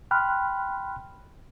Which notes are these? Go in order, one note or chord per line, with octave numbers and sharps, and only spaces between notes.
G5 B5 C6 F6 F#6